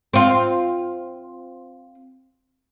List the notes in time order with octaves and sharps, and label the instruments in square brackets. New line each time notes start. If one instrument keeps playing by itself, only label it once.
[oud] C4 F4